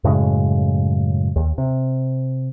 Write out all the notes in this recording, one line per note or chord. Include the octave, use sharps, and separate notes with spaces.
F#2 A2 C#3 G#3
D#2
C3